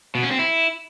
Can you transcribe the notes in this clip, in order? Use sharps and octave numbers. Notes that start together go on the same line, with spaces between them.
B2
C#4
C4
E4